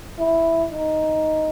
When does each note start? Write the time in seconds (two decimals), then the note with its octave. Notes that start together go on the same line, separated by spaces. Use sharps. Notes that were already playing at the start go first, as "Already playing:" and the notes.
0.19 E4
0.72 D#4